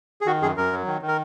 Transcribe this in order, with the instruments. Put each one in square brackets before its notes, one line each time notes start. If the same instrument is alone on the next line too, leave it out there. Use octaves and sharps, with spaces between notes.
[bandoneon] G#4
D#3 F#4
F#2 G#4
F#2 A#4
F#3
D#3
D#3
A#4